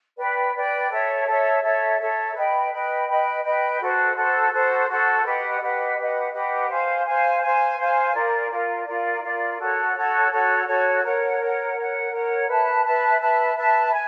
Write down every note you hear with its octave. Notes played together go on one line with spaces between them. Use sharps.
B4 D5 G5
B4 D5 G5
A4 C#5 E5
A4 C#5 E5
A4 C#5 E5
A4 C#5 E5
B4 D#5 G5 B5
B4 D#5 G5 B5
B4 D#5 G5 B5
B4 D#5 G5 B5
F#4 A4 C5
F#4 A4 C5
F#4 A4 C5
F#4 A4 C5
G4 B4 D#5 F#5
G4 B4 D#5 F#5
G4 B4 D#5 F#5
G4 B4 D#5 F#5
C5 F5 G#5
C5 F5 G#5
C5 F5 G#5
C5 F5 G#5
F4 A#4 D5
F4 A#4 D5
F4 A#4 D5
F4 A#4 D5
F#4 A4 C#5
F#4 A4 C#5
F#4 A4 C#5
F#4 A4 C#5
A#4 C#5 F#5
A#4 C#5 F#5
A#4 C#5 F#5
A#4 C#5 F#5
B4 E5 A5
B4 E5 A5
B4 E5 A5
B4 E5 A5
G#5